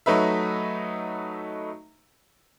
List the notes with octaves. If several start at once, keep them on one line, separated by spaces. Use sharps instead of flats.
F#3 A3 D#4 B4 E5